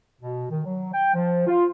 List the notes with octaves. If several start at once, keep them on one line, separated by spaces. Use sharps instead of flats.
B2
D#3
F#3
G5
F3
F4